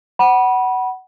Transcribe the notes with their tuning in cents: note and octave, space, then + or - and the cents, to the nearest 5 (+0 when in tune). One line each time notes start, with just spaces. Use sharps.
F#5 +20 B5 -25